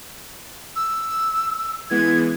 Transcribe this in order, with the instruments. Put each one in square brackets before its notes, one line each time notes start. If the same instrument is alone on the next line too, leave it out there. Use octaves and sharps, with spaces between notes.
[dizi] E6
[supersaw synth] E3 G#3 B3 [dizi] G#6